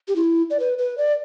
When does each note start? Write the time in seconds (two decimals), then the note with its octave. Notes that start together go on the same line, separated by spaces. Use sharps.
0.08 G4
0.16 E4
0.50 D5
0.59 B4
0.78 B4
0.98 D5